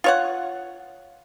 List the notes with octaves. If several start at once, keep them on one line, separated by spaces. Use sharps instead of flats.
F4 C#5 F#5